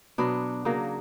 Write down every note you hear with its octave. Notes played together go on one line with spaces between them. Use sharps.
B2 F#3 B3 D4
C#3 F#3 A#3